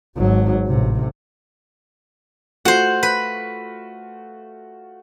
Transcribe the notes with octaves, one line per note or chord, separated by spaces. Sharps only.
G#1 F#3
A1 C3
A3 F4 F#4 C5 F#5
B4